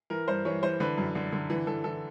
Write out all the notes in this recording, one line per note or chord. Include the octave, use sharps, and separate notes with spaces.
E3 A#4
G2 C5
E3 C#5
E3 C5
D3 B4
F#2
D3
D3
E3
E3 A4
E3 A4